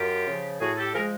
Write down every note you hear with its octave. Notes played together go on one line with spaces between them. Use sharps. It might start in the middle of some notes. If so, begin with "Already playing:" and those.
Already playing: F#2 F4 G4
C#3 F3
A2 F#4 G#4
G4 A4
F3 G#3 G#4 A#4